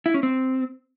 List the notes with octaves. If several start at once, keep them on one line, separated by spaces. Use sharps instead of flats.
E4
C#4
C4